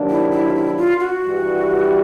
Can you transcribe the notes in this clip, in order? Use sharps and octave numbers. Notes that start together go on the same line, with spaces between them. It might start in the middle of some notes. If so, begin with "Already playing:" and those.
Already playing: C3 D#3 F#3 A#3 D4
E4
E4
F4
E4
F4
F#4
G2 E3 G3